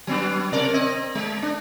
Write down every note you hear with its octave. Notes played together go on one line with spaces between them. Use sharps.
F#3 B3 D4
C3 A#4 D5
C4 D#5
G#3
D4